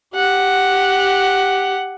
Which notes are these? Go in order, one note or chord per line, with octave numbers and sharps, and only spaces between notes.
G4 F#5